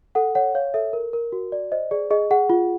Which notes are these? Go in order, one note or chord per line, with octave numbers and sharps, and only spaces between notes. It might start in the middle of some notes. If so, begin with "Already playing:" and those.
A4 F#5
C#5 F#5
C#5 F5
A4 E5
A#4
A#4
F#4
D5
C5 D#5
G#4 D5
G#4 D#5
G#4 F#5
F4